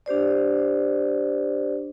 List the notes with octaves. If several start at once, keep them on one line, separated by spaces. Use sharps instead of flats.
D4 G4 C5 D5